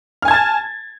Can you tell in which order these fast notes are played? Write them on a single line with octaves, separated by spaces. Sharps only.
F6 G#5 G#6 A5 A6